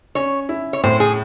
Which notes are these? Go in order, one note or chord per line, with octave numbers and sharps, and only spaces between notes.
C#4 C#5
E4
C#5
A2 C5
G#4